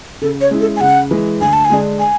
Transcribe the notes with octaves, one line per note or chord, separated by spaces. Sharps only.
C#3 A4
C#5
G#3 C#4 E4
A4
G#5
C#3 F#5
E3 G#3
D2 G#5
A5
G#5
D3 G#3 D4
G#5